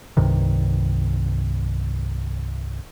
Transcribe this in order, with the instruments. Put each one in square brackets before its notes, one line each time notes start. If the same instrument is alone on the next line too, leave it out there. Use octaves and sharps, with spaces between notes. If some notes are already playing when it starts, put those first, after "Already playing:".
[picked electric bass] C2 G2 C3 D#3